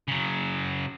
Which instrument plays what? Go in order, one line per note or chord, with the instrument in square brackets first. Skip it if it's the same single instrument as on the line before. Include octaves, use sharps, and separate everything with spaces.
[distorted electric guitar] C#3 F#3